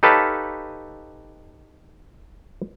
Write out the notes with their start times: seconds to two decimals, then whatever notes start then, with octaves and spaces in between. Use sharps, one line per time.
0.03 D#4 G4 A4 B4 C#5 F5